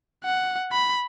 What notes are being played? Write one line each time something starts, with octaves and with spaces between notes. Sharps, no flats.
F#5
B5